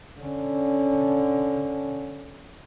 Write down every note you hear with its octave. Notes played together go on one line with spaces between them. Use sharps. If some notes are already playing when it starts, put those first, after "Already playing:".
D3 C#4